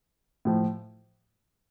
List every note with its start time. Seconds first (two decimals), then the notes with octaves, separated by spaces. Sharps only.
0.45 A2 F3